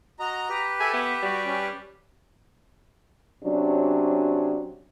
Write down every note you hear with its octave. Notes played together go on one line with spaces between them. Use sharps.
F#4 D#5 A#5
G4 B4
A4 E5 G#5
B3 E5
G3 F#4
C#4
C3 F#3 C#4 D4